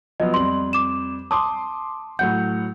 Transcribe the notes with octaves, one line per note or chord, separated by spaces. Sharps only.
F3 F#3 B3 D#5
F2 G3 C6 F#7
D6 E7
A5 C6 D6 D#6
A2 F#3 F#5 G6